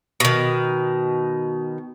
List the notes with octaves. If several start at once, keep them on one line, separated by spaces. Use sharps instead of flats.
B2 D#3